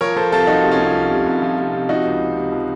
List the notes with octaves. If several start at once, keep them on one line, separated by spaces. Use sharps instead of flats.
F3 A#4 C#5
F3 A4 C5
C2 F4 A4
F3 D#4 F#4
C3
C#4 F4
C2
C2
C3
C2
F3
C3
C3
F3 D#4 F#4
C#2
C3
C3
F3